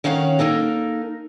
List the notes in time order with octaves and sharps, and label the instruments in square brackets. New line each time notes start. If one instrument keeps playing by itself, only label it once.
[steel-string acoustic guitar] D#3 C#4 C#5 F5 F#5
A#3 D#4 A4 A#4